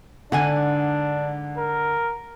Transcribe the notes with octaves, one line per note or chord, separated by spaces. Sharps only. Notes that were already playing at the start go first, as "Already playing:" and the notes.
G#2 D3 D4 F#5 G#5
A#4